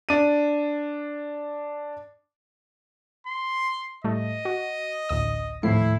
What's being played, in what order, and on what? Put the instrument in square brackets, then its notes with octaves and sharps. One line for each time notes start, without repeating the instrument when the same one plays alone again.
[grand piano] D4 D#7
[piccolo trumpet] C6
[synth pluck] A2 G3 A3 [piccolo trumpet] D#5
[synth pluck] F#4
A1 D2 D#6
[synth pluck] D#2 F3 C7 [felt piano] A2 [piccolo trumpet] E4